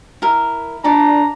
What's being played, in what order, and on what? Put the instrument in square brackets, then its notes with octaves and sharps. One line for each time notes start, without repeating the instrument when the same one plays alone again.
[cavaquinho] E4 A#4
[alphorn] D4 [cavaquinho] A4 D5 B5 [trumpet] A#5